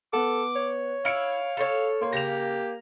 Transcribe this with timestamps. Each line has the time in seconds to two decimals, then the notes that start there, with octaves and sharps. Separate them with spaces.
0.13 B3 A4 F#5 D6
0.56 C#5
1.05 E4 F5 F6 C#7 D7
1.57 A4 C5 C#5
2.01 A#3 C#5 C6
2.13 C#3 G4 A#6 F7